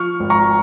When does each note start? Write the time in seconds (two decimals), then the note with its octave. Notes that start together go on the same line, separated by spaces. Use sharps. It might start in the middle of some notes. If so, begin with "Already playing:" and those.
Already playing: F3 C#6 F6
0.20 G#1
0.30 A#5 C#6